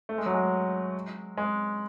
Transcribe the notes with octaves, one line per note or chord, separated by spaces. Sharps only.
A3
G#3
F#3
G#3
G#3